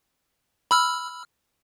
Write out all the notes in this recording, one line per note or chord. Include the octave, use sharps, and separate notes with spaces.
B5 E6 F6